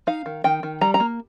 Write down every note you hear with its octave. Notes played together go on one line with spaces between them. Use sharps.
D#4 F5
D#3
D#3 G5
D#3
G3 A#5
A#5
A#3